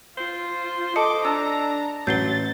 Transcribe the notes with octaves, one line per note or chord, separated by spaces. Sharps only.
F4 C5
A4 D#5 A5 D6 C#7
D4 A5 A#5 E6
A1 F#3 G6 A6 C7 G7